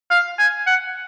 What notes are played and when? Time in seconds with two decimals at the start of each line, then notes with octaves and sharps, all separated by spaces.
0.10 F5
0.39 G#5
0.67 F#5